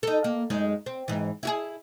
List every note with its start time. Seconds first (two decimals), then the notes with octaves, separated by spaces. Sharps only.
0.03 D#4 A4
0.24 A#3
0.50 F#2 G#3 D#4
0.86 C4
1.08 G#2 E3
1.43 E4 F#4 G#4